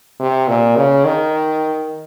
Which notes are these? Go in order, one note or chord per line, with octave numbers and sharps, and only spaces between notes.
C3
A#2
C#3
D#3